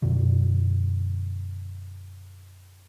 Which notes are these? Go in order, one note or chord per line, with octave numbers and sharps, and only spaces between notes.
F#2 B2 D3